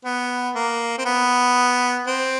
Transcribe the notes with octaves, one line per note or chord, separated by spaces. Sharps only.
B3
A#3
C4
B3
C4